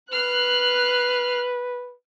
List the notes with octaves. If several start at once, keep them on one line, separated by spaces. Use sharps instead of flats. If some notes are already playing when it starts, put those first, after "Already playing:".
B4 F6 F#6 C7